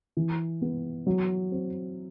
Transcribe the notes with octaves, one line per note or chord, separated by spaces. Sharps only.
E3
B3
F#3
C4